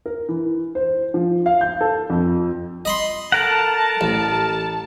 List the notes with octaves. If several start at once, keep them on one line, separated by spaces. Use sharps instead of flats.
A#4
E3
C5
F3
F5
G6
A4
F2
D#5 B5 C6
A4 A#4 F#5 A5
A1